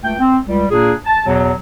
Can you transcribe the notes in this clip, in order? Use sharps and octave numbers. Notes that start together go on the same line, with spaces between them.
C#2 A3 G5
C4
C#2 G3
A#2 A#3 D4 G#4
A5
E2 B2 F#3